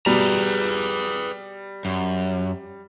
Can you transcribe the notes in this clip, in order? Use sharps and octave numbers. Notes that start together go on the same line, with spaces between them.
B2 G3 G#4 B4 A#5
F#2